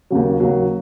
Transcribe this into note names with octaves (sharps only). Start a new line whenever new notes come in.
D#2 C#3 F#3
D#2 C#3 F#3